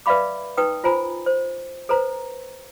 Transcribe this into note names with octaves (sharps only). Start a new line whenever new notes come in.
B4 D5 E5 F5 B5 D6
D#4 B4 G5 D#6
F4 C5 G#5 A#5 B5
C5
A4 B4 C5 A#5